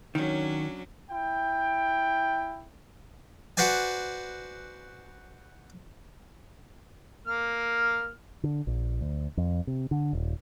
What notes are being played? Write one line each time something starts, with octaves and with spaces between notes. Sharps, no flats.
D#3 F#3 C#4 D4
E4 G5
F#4 B4 C5 D5 G#5
A#3 F6
D3
A#1
D2
F2
C3
D3
D#1